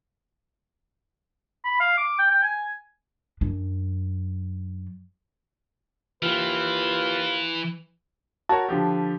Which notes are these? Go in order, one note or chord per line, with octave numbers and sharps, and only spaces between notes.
B5
F5
D6
G5
G5
G#5
F#2 D4
D#2 E3 F4 B4
F#4 A#4 C#5 A5
D3 F3 G4